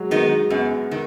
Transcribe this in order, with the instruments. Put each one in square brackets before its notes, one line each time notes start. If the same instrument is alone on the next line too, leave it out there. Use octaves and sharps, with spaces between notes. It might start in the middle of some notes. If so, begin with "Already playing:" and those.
Already playing: [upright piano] F#3 G#3
[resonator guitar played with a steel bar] D#3 B3 D#4 [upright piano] G#3
[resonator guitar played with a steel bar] F#2 [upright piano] B3
[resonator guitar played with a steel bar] D#3